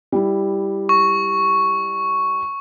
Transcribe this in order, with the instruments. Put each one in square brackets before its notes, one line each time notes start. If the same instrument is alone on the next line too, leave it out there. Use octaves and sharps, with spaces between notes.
[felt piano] G3 E4
[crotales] C#6